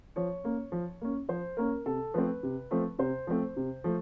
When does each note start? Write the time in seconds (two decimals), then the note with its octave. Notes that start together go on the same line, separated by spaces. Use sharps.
0.16 F3 C#5
0.44 A#3 C#4
0.72 F3
1.01 A#3 C#4
1.29 F3 C5
1.57 A#3 C#4 A#4
1.86 C3 A4
2.14 F3 A3 C4 B4
2.43 C3
2.71 F3 A3 C4
2.99 C3 C5
3.27 F3 A3 C4
3.57 C3
3.84 F3 A3